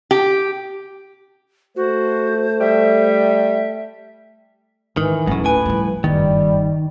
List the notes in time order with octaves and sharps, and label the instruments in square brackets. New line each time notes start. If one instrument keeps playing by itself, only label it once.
[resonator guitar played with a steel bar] G4
[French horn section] A3 [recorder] F#4 [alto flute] C5
[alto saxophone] G3 [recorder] E5
[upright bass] G#2 [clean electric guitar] D#3 [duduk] E3
[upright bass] D1 C#4 [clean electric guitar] F#2 A2
[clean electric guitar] A2 G#5 [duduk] B4
[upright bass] F3 G3
[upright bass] F#1 G2 [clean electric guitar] D#3 [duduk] G3